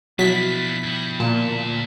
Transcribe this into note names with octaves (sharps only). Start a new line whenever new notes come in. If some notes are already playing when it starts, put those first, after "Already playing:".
B2 F3 F#3 A#3 D4 E4 B6
G2 G3
D2 A#2 A5